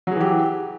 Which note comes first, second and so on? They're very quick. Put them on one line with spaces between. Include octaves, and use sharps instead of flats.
F#3 G#4 E3 G4